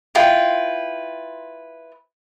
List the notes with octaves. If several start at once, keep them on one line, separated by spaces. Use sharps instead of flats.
E4 F4 B4 G5